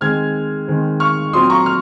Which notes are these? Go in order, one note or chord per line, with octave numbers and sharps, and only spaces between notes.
D#3 G#3 C4 F6 G#6
D#3 G#3 C4
C#6 F6
A#2 F#3 C4 C6 D#6
A#5 C#6
F6